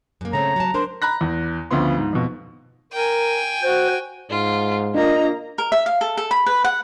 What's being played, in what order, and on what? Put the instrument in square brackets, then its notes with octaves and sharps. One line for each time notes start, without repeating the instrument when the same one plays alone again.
[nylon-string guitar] F#2 A#3
[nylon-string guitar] C#3 A3 C4 [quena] C#5 [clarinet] A#5
[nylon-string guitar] F#3 A5
[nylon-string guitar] D4 A#4 C5 [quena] C6
[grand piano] A#5 B5 F#6 A#6
E2
D2 C#3 F3 B3 C6
G#2
F2 B2
[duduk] A#4 [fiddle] G5 G#5
[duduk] F#4 [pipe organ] C5
[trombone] G#2 [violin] F4
[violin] A#3 A#5 [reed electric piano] D4 F4 [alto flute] D#5
[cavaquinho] A#4
E5
F5
A4
A4
B5
B4
F#5